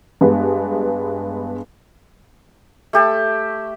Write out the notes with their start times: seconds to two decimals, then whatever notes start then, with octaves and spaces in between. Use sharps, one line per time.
0.21 G2 G#3 B3
2.93 A3 G4 A5